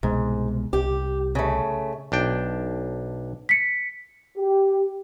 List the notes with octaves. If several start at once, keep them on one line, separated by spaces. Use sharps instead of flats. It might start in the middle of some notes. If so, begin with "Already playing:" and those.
C2 G#2 B2 G#3
C2 G4
C#3 A3
B1 D4 G5
B6 C#7
G4